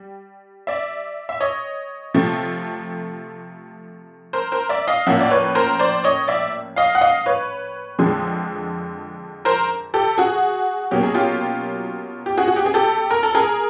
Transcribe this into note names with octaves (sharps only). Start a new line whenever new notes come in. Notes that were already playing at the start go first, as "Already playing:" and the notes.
Already playing: G3
D5 E5
E5
C#5 D#5
C3 F3 A3
A#4 C5
A#4 C5
D5 E5
D#5 F5
A2 F3 A#3 C#4 E5 F#5
D5
B4 C#5
A#4 C5
C5 D5
C#5 D#5
D5 E5
D#5 F5
F#5
D#5 F5
B4 C#5
F2 D3 F3 G#3
A#4 C5
G4 A4
F#4 G#4
B2 F#3 A#3 C#4 G4
G#4
F4 G4
G4
F#4 G#4
F#4
G4
G#4
G4 A4
A#4
A4
G#4 A#4